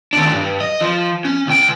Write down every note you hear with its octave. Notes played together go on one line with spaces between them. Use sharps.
D#2 D4
G2
D#5
F3
C#4
C#2 G5